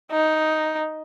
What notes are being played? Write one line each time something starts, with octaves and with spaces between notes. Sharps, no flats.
D#4